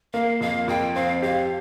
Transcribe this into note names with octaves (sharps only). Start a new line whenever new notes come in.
A#3 F5
F2 F5
F2 G5
C4 F5
G4 F5